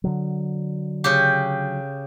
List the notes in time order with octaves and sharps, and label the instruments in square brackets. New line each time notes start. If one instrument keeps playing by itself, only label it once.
[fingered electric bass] D3 F#3
[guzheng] C#3 G4